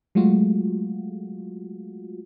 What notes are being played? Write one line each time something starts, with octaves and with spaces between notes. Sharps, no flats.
F#3 G#3 A3 F4 F#4